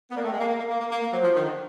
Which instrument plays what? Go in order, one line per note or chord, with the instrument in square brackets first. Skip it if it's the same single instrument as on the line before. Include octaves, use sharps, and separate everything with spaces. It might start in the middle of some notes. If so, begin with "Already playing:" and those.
[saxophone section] B3
[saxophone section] A#3 [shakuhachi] D5
[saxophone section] A3
[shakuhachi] G5
[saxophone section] G#3
[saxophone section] A#3 [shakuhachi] F5
[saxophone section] A#3
A#3
A#3
A#3
A#3
A#3
[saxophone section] F#3 [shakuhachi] C5
[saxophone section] F3
D#3
D3